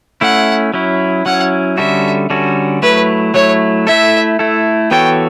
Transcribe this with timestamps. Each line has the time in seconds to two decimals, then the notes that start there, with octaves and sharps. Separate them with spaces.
0.21 A3 C#4 E4 F#5
0.74 F#3 C#4 E4
1.26 F#3 C#4 E4 F#5
1.78 D3 G3 C#4 F#4 A4 E5
2.30 D3 G3 C#4 F#4 A4
2.82 F#3 A3 E4 B4
3.34 F#3 A3 E4 C#5
3.87 A3 E4 A4 E5
4.39 A3 E4 A4
4.91 E3 B3 F#4 A4 C#5 G5